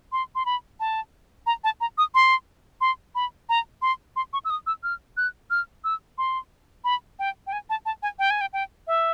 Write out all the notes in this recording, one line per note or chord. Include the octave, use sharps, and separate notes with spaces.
C6
C6
B5
A5
A#5
A5
A#5
D#6
C6
C6
B5
A#5
C6
C6
C#6
E6
D#6
E6
F6
F#6
F6
E6
C6
B5
G5
G5
G#5
A5
A5
G#5
G5
G#5
G5
G5
E5